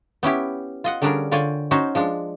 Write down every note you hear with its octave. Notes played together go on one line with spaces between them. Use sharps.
B3 C#4 E4 G4
F4 D#5 F#5
D3 G3 C#4 D4 G#4 A#4
D3 F4 C#5 D5 G5 G#5
C#4 D#4 F#4 C5
F3 G#3 D4